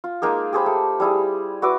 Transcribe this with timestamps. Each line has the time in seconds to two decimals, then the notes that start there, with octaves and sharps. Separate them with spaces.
0.04 F4
0.22 G#3 A#3 D#4 G#4
0.53 G4 G#4 C5 B5
0.66 A3
1.00 G3 E4 G#4
1.62 F#4 B4 E5 D6